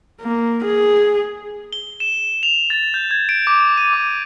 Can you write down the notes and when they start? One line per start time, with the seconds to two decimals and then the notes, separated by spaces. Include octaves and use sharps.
0.22 A#3
0.65 G#4
1.73 G7
2.00 E7
2.43 F7
2.70 A6
2.94 G6
3.11 G#6
3.29 D7
3.47 D6
3.77 D#7
3.93 D6